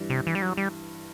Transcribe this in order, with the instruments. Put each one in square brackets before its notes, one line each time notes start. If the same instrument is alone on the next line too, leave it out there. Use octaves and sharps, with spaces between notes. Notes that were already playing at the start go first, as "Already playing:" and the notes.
Already playing: [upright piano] G2 E3 G3
[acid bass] C3
E3
G3
F#3
G3